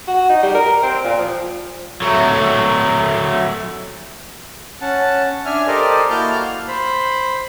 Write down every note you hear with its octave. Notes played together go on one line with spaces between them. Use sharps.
F#4
D#4
G3
A#4
C4
A#2
F3
F#3 A3
C#4 F#5 A5
D4 E5 G#5 F6
G4 A4 A#4 C5 D5 D#5
A#3 E4 F#4 A5 F6 G6
F5
C5 B5